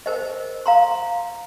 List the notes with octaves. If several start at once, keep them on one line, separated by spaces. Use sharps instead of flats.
A#4 C5 D#5
F5 A#5 C6